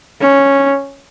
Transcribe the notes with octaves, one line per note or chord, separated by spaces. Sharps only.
C#4